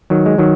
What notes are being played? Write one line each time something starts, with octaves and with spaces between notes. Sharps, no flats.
D#3 F#3
G#3
D#3 F#3